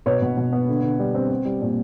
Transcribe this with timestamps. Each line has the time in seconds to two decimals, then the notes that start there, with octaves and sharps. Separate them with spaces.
0.06 B2 B4 C#5
0.22 B2
0.37 B2
0.53 B3
0.68 D3
0.83 D3
0.99 G3
1.15 C4
1.30 C4
1.45 G3
1.62 A#2